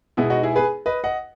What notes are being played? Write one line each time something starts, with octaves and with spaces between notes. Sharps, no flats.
B2 G#3 B3 E4
D#4 F#4
E4 G#4
G#4 B4
B4 D#5
D#5 F#5